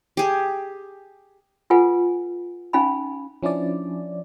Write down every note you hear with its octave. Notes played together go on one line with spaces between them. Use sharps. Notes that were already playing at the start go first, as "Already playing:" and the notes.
G4 G#4
F4 A4 B4 F#5 G#5
C#4 D#4 F5 G#5 B5
F3 C#4 D4 E4 D5